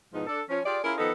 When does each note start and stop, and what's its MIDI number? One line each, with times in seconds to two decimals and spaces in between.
0.14 0.24 40
0.14 0.24 44
0.14 0.24 47
0.14 0.24 53
0.14 0.24 59
0.14 0.24 63
0.27 0.41 62
0.27 0.41 69
0.49 0.60 53
0.49 0.60 61
0.66 0.78 65
0.66 0.78 67
0.66 0.78 68
0.66 0.78 74
0.84 0.94 61
0.84 0.94 64
0.84 0.94 65
0.84 0.94 68
0.84 0.94 70
0.98 1.12 51
0.98 1.12 53
0.98 1.12 59
0.98 1.12 63
0.98 1.12 69